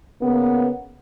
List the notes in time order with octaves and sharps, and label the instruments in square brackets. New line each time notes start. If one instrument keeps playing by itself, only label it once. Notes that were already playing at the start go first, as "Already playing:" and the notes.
[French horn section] C#3 A#3 B3